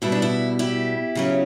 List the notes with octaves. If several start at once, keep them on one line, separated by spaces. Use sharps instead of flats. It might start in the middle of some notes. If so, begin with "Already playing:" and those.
B2 G3 B3 D4 E4
D4
E4
E4 G4
C#3 F#3 C#4